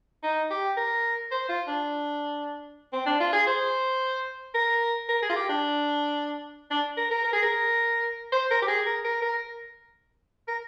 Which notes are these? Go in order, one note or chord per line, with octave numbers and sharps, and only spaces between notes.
D#4
G4
A#4
C5
F4
D4
C4
D4
F4
G#4
C5
A#4
A#4
G#4
F4
G4
D4
D4
A#4
A#4
A#4
G#4
A#4
C5
A#4
G4
G#4
A#4
A#4
A#4
A#4